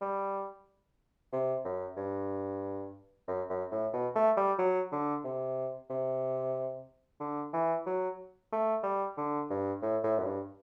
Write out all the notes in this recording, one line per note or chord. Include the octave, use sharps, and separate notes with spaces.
G3
C3
F#2
G2
F#2
F#2
A2
B2
A3
G3
F#3
D3
C3
C3
D3
E3
F#3
A3
G3
D3
G2
A2
A2
F#2
G2